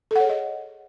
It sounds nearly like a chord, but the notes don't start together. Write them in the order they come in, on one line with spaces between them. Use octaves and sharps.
A4 F#5 C#5 G#4 D#5